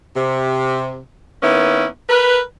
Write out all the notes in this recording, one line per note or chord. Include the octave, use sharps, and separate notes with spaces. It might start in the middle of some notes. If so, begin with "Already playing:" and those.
C3
D#3 A#3 B3 C#4 E4
A#4 B4